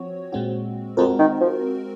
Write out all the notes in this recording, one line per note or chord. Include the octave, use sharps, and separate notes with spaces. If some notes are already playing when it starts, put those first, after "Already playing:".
Already playing: F3 C4 F#4 C#5
A#2 G#3 C4 F#4
F2 G#3 C4 F#4 A#4
D#3
F3